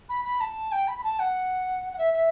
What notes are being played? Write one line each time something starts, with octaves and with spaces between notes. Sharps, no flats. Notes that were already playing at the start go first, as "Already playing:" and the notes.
B5
B5
A5
G5
B5
B5
A5
F#5
F#5
E5
E5